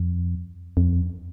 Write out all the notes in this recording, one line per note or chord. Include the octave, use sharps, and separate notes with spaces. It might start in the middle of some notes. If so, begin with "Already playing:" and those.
Already playing: F2
F2